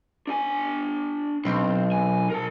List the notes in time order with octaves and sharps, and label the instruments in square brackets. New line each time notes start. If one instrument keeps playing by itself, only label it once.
[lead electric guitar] D4 G#5
[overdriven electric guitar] B1 [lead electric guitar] C4
[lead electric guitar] G#5
A#4 A5